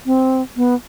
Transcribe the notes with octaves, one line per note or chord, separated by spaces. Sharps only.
C4
B3